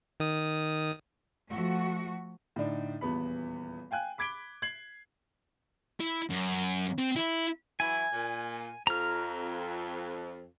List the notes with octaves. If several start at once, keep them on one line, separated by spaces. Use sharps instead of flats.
D#3 D#6
F3 A3 F#4
A2 D3 D4 D#4
D#1 E2 B3 B5
F5 G5 G#5 F#6
B5 D6 G#6 B6 D7 G7
G#6 C7 F#7
E4
F#2
C4
E4
E3 F#3 E4 G#5
A#2
F2 A#5 F6